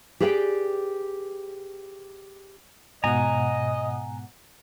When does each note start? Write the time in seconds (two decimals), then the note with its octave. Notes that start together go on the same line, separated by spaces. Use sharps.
0.20 G4 G#4 B4 D5 F#5 G5
3.04 G#2 B2 D#5 F#5 G#5 A#5